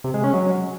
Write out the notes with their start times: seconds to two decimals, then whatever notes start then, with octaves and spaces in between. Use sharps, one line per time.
0.04 C3
0.14 G#3
0.24 C#4
0.33 F#3